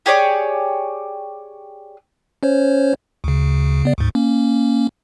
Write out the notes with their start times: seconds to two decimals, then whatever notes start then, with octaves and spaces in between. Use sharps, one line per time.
0.06 G4 G#4 C#5 D5
2.43 C#4 C5 C#5
3.24 D2 C#3
3.84 C#3 B3 D5
3.98 D2 G#2
4.15 A#3 C#4